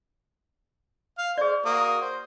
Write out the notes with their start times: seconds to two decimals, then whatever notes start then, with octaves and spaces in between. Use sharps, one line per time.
1.18 F5
1.38 G#4 C5 D5
1.65 A#3 F#4 D#6
2.01 C5